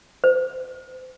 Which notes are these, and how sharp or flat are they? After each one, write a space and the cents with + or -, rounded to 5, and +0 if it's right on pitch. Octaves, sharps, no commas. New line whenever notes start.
C5 -35